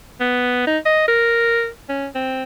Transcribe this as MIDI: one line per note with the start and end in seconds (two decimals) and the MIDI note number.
0.20 0.63 59
0.67 0.78 63
0.85 1.07 75
1.08 1.68 70
1.89 2.07 61
2.15 2.43 60